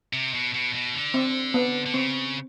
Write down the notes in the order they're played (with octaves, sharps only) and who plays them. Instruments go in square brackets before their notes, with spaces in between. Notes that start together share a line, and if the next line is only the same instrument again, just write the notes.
[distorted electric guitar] C3
B2
B2
B2
D3
[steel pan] C4
B3
[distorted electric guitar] D3
[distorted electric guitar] C#3 [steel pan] C4